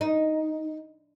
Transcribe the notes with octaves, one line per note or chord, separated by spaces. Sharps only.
D#4